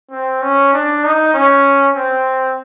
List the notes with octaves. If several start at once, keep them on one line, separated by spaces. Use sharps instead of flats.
C4
C#4
D4
D#4
C#4
C4